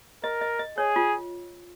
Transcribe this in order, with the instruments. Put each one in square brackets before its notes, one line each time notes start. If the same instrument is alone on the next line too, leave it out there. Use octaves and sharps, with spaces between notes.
[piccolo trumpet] A#4 [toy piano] D#5
[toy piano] D#5
D#5
[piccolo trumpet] G#4 [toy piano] C#5
[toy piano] F4